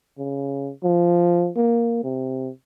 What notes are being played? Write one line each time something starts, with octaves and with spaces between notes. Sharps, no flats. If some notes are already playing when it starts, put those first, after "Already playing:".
C#3
F3
A#3
C3